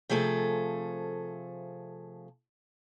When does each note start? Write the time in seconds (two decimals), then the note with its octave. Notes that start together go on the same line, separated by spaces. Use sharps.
0.09 C3 F3 A3 G#4 A4